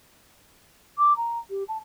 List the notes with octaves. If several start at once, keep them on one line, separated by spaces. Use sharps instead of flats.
D6
A#5
G4
A5